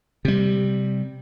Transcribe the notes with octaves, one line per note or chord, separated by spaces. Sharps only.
C3 G3